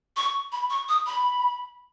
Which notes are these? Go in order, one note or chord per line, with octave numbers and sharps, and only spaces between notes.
C#6
B5
C#6
D#6
B5